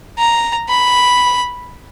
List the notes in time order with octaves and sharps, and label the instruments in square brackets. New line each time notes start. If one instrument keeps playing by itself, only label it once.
[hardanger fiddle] A#5
B5